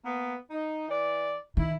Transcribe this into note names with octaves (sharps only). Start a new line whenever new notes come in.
A#3 B3
D#4
E3 D5
D#3 E4